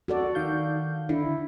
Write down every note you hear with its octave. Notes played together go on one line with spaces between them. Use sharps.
F#4 A4 D5
D#3 F5 G6
D3 E4